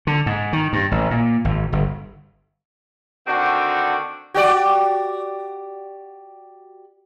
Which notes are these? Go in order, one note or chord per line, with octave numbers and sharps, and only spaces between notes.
D3
G#2
D#3
G2
A1
A#2
G#1
G1
D3 D#3 C4 D4 F#4
F#4 G4 D5